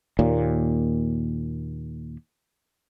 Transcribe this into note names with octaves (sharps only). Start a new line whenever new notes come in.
D#2 A#2